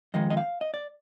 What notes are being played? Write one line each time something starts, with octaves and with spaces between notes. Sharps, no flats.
F2 D#3 G#3 D#5
D#5
F5
D#5
D5